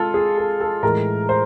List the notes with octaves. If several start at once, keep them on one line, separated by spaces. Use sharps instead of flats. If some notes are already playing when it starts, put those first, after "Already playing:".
Already playing: G#3 F4 A4
G#4
A4
A4
A2 E3 G#3 A#4
C5